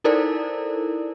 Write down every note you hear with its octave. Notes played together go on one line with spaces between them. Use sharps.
D#4 E4 A4 A#4 C5 D5